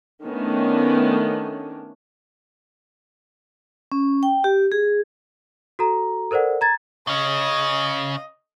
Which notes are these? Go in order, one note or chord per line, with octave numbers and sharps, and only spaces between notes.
D#3 A3 B3 C#4 D4
C#4
G5
G4
G#4
F#4 A4 A#5
A4 A#4 C5 D5 F#5
A#5 G#6 A6
C#3 C#4 D#5